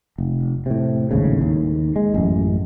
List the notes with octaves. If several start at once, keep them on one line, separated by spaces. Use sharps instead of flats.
F1
A2 C3
D#1 G#1 A2 C#3
D#2
G#3
A1 F#2